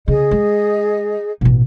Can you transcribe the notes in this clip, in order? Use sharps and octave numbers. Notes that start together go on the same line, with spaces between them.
C#3 G#4 D#5
G#3
A1 B2